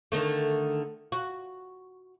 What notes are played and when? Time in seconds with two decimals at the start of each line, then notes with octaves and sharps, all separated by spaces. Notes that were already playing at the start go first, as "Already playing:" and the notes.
0.12 D3 D#3 A3
1.12 F#4